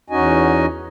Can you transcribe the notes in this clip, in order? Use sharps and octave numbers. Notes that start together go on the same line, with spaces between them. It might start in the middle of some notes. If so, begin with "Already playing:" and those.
E2 C#4 D#4 F#4 D#5 G#5